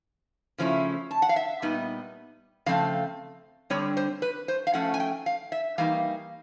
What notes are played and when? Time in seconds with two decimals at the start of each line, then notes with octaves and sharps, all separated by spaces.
0.58 C#3 F3 A3 C#4 E4
1.11 A5
1.22 F#5
1.29 F5
1.36 E5
1.62 A#2 G3 B3 D#4
2.66 C#3 F3 A3 C4 F5
3.70 D3 G3 C4 C#5
3.97 C5
4.22 B4
4.48 C5
4.67 F5
4.74 F3 A3 C#4 F#5
4.94 G#5
5.00 G5
5.26 F5
5.52 E5
5.78 E3 G3 A#3 D#4 F5